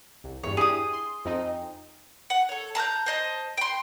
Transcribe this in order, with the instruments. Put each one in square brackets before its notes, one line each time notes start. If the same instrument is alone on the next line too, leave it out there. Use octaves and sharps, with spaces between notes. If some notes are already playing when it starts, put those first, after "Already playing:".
[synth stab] C2
[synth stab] E2 G2 [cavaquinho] C#5
[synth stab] D4 E4 G4 [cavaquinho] G#4 D#6
[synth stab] C6
F2 C4 D#4
[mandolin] F#5
A4 C#5
A5 A#5 F6 G6
C5 D#5 A5
G5 C6